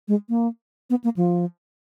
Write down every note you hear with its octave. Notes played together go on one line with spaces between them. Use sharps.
G#3
A#3
B3
A#3
F3